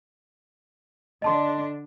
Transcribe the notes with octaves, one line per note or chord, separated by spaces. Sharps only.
D3 D4 D#5 A5 C6